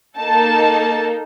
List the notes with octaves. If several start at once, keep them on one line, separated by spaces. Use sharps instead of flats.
A#3 D#4 A4 A5